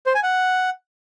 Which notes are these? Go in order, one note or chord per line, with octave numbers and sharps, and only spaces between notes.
C5
G#5
F#5